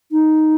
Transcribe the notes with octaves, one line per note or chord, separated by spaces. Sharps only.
D#4